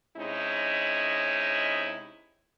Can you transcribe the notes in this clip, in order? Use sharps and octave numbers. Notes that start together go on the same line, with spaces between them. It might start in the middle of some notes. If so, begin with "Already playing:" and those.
C3 G#3 C#4 D#4 E4